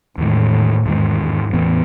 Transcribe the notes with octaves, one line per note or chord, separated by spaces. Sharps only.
E2 A2 D#3 G#3
E2 G#2 D#3 G#3
G#2
E2 A2 E3 B3